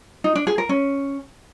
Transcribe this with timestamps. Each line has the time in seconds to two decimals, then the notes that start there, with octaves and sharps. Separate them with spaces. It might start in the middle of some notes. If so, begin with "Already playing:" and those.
0.24 D#4
0.36 D4
0.47 G#4
0.58 A#4
0.69 C#4